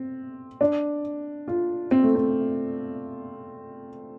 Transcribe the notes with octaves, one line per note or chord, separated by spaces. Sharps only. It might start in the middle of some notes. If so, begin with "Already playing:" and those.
Already playing: C4
D4
F4
C4
A3
C4